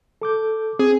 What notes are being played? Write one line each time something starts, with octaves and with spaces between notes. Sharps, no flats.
A4 D6 G6
C4 G#4